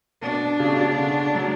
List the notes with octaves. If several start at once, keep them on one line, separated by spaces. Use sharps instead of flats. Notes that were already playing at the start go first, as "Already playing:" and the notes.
B2 D4
C#3
B2
C#3
D3
F#3